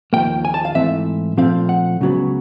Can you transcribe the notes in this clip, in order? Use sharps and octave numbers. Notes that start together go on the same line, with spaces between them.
D#2 C#3 F3 A#3 G5
G#5
A5
F5
G#2 E3 A3 C4 E5
A#2 F3 A3 C4 F5
F#5
C#2 C#3 F#3 B3